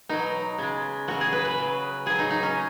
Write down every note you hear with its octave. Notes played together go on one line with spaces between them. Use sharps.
B2 F#3 D#4
C#3 G#3
C#3 F#3 F#4
G#4
B4
B4
C#3 F#3
C#3 F#3 G#4
D#4
D#4
C#4